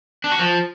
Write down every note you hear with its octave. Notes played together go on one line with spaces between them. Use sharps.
D4
F#4
F3